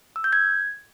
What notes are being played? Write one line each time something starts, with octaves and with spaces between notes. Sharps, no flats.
E6
G6
G#6